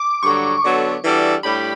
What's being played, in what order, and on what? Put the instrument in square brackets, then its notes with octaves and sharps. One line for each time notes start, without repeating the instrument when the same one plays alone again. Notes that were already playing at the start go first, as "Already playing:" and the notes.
Already playing: [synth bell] D6
[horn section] G2 D3 F#3 [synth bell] C#6
[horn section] D3 F#3 B3 F#4 A4
E3 G3 D4 F#4 A4
[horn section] A2 G3 D4 G4 [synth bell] B5